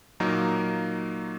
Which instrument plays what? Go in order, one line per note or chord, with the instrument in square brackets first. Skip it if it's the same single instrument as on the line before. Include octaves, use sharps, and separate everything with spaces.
[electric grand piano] A#2 F#3 A#3 D#4 A#4